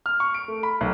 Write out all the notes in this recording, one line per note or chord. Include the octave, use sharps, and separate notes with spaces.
F6
C#6
D7
A3
B5
B1